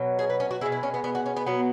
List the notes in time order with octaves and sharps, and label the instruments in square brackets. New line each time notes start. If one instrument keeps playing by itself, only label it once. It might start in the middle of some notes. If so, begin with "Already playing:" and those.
Already playing: [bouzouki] B2 F#3
G#4
B4
C#4
F#4
B2 G#3 E4
E4
C#4
B3
B3
F#4
C#4
B3
B2 F#3 B3